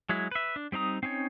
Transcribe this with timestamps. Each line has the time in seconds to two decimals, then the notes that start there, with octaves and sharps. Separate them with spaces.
0.09 F#3 G#3 E4
0.31 B4 E5
0.56 D4
0.72 G3 C4 D#4 A#5 D#6
1.03 C4 C#4 D#4 C#5